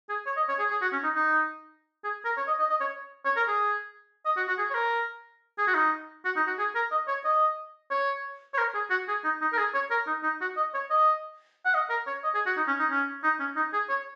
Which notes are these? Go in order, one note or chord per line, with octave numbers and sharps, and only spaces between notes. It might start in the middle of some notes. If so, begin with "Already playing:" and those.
G#4
C#5
D#5
C#5
G#4
G#4
F#4
C#4
D#4
D#4
G#4
A#4
C#5
D#5
D#5
D#5
C#5
C#5
A#4
G#4
D#5
F#4
F#4
G#4
C#5
A#4
G#4
F#4
D#4
F#4
D#4
F#4
G#4
A#4
D#5
C#5
D#5
C#5
C#5
A#4
G#4
F#4
G#4
D#4
D#4
A#4
G#4
C#5
A#4
D#4
D#4
F#4
D#5
C#5
D#5
F#5
D#5
A#4
C#5
D#5
G#4
F#4
D#4
C#4
D#4
C#4
D#4
C#4
D#4
G#4
C#5